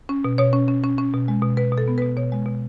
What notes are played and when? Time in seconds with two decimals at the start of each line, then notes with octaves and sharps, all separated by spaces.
0.09 C#4
0.25 B2
0.38 B2 C#5
0.53 C#4
0.68 C#4
0.83 C#4
0.98 C#4
1.13 B2
1.28 G#3
1.42 B2
1.57 B2 B4
1.72 B2
1.78 A4
1.88 B3
1.98 B2 B4
2.16 B2 C#5
2.32 G#3
2.46 B2